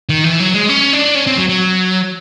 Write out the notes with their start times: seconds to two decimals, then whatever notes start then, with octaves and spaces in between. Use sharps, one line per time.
0.09 D#3
0.24 E3
0.40 F#3
0.54 G#3
0.69 C#4
0.93 D4
1.15 C#4
1.27 C4
1.37 F#3
1.49 F#3